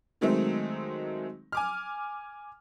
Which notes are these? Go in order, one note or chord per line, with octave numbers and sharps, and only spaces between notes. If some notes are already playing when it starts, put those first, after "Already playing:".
D#3 F#3 G#3 A3 C4 D#4
G#5 D6 F6